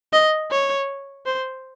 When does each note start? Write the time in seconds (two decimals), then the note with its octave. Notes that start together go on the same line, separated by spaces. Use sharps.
0.13 D#5
0.51 C#5
1.26 C5